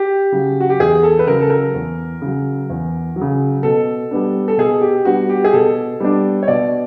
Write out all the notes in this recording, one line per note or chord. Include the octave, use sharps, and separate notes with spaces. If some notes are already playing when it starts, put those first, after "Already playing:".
Already playing: G4
C#3 F#3
F#4
G4
E2 G#4
A4
B4
C#3 F#3 A#4
A4
A#4
E2
C#3 F#3
E2
F#3
C#3
B2 A4
G3 B3 D4
A4
B2 G#4
G4
G3 B3 D4 F#4
G4
G#4
B2 A4
G3 B3 D4
C#5
B2 D5